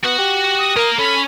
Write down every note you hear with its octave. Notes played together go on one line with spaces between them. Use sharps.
B3 F#4 F#5
G4
D#6
A#3 A#4 A#5
C#4 A4 B5